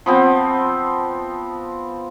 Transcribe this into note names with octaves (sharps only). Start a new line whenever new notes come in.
F3 B3 C4 G5